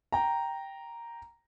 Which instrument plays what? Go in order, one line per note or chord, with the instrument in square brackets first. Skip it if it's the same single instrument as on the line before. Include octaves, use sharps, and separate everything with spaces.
[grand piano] G5 A#5